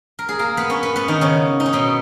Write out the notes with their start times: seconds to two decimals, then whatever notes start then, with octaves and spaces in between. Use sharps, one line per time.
0.19 A#4
0.29 G#4
0.39 A#3 A#4
0.57 B3 B4
0.70 C#4 C#5
0.83 B3 B4
0.96 B3 B4
1.08 D#3 D#4
1.21 C#3 C#4
1.60 D#4
1.66 C#4
1.73 B2 B3